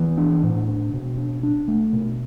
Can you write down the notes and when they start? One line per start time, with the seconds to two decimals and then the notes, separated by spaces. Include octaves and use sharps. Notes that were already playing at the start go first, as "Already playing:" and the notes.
Already playing: E3 B3
0.17 D4
0.43 A2
0.69 D4
0.93 B2
1.17 D4
1.43 D4
1.68 A3
1.93 B2